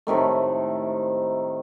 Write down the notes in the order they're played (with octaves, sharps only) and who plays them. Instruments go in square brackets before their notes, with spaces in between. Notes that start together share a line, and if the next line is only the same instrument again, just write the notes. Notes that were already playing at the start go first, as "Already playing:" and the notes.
[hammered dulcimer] A2 C3 D#3 A3